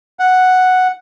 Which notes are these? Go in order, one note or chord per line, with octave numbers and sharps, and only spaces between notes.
F#5